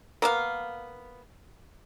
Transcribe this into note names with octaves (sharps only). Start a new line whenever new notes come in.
A#3 B3 F5